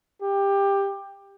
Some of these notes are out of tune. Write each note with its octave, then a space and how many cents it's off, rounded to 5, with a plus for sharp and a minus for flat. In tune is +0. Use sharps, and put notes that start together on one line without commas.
G4 +15